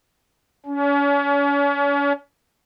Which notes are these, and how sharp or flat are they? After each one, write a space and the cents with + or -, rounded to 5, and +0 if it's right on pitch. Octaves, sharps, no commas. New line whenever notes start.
C#4 +35